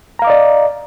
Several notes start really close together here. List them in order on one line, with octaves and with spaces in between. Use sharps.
A#5 F5 D6 D#5 D5